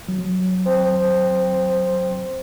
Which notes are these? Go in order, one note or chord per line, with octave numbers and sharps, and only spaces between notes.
F#3
C4